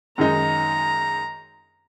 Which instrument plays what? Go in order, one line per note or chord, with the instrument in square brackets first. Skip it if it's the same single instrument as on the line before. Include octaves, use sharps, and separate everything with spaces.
[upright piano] F#2 D#3 G#3 D#4 [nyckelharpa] A#5